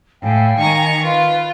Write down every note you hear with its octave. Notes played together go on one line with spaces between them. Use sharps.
A2 F5 G5 G#5
D#3 A#5 C#6
F4 B4 F5